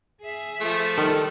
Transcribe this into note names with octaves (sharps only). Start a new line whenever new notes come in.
G#4 E5
F3 A3
D#3 G3 A4